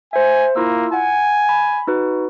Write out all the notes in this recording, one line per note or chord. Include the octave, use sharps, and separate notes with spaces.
C5 E5 G#5
A#3 E4 F4 E6
F#5 G#5
B5
D#4 F#4 B4